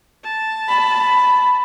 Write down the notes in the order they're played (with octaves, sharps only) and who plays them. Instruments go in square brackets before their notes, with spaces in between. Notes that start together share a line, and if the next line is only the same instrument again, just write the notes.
[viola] A5
[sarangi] B5